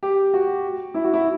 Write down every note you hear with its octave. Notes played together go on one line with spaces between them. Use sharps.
G4
F#4
E4
F#4
E4